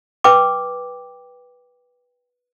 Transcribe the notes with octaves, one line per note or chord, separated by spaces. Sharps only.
B4 G5 D6